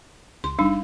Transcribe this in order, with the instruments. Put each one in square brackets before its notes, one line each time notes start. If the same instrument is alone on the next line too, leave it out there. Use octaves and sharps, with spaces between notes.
[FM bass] C#2 [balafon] C6
[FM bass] F#1 [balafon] G3 D4 D#4